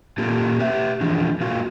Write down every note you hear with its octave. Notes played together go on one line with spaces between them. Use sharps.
A#2 A#3 F4 G4 A4
G4 B4 E5
E3 F3 G#3 D4
F#3 G#3 A#3 F4 F#4